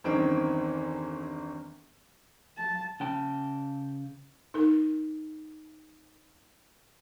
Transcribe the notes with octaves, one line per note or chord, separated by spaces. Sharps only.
G1 E2 D#3 C4 C#4 D7
A5
C#3 G5 A5
D#4 A#4